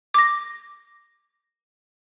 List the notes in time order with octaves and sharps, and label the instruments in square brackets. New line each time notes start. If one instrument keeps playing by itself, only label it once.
[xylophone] D6 A#6